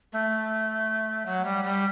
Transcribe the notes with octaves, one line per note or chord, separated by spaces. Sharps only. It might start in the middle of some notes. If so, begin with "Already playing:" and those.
A3
F#3
G3
G3